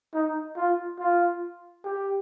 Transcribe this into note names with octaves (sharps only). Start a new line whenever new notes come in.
D#4
F4
F4
G4